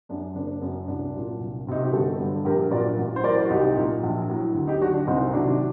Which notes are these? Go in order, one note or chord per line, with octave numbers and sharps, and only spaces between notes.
F#2 F#3 D4
F#1 D4
F#2 F#3
C2 D4
A#2 F#3
C2
C3 F#3 D#4
F#4
G4
G1 F#4 A4
G2 D3
A#1 G4 A#4
A#2 F#3 A#4 D5
A1
C5
A2 F#3 A#4 D5
F#4
C2 D#4 G4
A#2 F#3
A#1
A2 F#3
D2
D#4 G4
D3 F#3 D4 F#4
D4
C2 C4 D#4
C3 D#3 F#3 D4 F#4